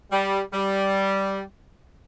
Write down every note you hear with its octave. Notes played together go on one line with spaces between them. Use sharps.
G3
G3